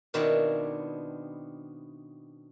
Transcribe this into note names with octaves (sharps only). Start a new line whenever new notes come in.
B2 D#3 B3 C4 D4 E4